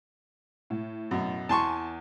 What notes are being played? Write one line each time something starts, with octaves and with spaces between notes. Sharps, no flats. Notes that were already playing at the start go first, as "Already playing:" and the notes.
A2
F#2 B2
E2 G#5 A5 C6 C#6